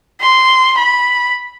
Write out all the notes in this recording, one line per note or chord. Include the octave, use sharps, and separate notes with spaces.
C6
B5